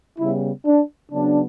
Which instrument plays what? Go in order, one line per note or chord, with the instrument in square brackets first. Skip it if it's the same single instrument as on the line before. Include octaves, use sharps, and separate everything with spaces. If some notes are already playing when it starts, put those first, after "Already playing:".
[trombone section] C#3 G3 B3 E4
D4
C#3 F#3 B3 D4